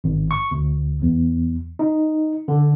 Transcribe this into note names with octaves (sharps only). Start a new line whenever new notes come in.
G#1
C#6
D2
E2
D#4
D3